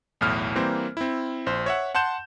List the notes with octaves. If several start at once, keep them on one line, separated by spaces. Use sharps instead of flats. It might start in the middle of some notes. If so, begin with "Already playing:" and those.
B1 E2 A2 F6
E3 G3 A#3 C4 A#4 C5
C4 E4
A#1 C5
C#5 E5 F#5
F#5 A5 C6 G6 E7